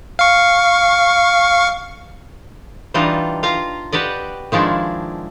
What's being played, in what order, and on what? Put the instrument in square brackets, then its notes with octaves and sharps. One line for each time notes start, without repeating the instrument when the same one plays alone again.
[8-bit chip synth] F5 C#6
[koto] E3 G3 D4 D#4 F4 D#5
F4 F5 A#5
F#4 G4 B4 D5 D#5
D#3 F3 G#3 D4 E4